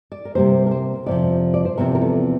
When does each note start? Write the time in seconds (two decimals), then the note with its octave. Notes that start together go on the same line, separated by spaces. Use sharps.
0.12 D5
0.25 A#4
0.35 C3 G3 A#3 C5
0.66 A#4
0.71 C5
1.06 F2 C3 F3 D5
1.54 D5
1.65 C5
1.77 E2 C3 F3 C4 A#4
1.95 A#4
2.01 A4